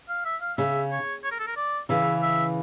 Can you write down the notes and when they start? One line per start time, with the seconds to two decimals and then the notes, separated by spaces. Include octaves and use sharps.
0.09 F5
0.25 E5
0.41 F5
0.58 C#3 E5
0.91 C#5
1.24 C#5
1.31 A#4
1.39 A4
1.47 A#4
1.57 D5
1.89 C#3 E3 E5
2.22 E5